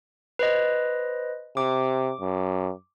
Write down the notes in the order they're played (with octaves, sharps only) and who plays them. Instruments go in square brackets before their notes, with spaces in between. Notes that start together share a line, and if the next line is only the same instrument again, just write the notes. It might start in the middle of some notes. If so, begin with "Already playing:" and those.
[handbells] B4 C5 D#5
[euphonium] C3 [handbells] D6
[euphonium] F#2